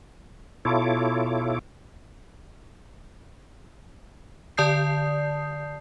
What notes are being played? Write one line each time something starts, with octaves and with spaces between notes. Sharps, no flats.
B2 E4 F4 A4 C#5 D6
D3 D5 A5 D#6 G6 C7